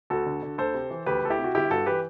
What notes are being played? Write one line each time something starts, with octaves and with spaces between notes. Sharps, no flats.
D2 F#4 A4
D3
D3
D2 A4 C5
C3
E3
D2 G4 B4
D2 A4
E4 G4
C3
F#4
G1 E4 G4
G2 F#4 A4
E3 G4 B4